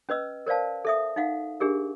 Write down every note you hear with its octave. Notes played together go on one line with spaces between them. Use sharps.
C#4 B4 D#5 E6
A#4 C5 D5 F5 A5
A4 E5 D#6
D#4 F5 F#5
D4 G4 G#4 A#4